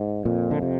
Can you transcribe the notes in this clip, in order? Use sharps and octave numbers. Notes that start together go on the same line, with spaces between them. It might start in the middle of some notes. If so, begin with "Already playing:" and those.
Already playing: G#2
F2 A#2
D3
C3